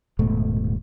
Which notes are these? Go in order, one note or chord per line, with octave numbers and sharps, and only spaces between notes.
D#1 G#2 B2 A3